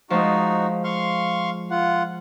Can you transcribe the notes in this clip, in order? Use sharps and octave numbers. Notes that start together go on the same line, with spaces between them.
F3 G#3 D#4 F#4
F5 C6 C#6
F4 F#5